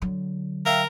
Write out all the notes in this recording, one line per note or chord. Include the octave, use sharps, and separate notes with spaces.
D3 F#3
A#4 E5 F5 G5